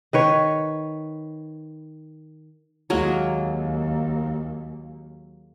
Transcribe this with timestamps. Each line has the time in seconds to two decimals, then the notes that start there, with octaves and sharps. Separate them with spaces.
0.13 D#3 B4 C#5
2.90 D#2 F#3 G#3 A#3